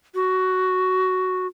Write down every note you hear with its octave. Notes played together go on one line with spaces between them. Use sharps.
F#4